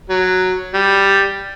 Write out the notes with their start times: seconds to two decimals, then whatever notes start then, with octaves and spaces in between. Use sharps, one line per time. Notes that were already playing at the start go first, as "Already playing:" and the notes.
0.10 F#3
0.74 G3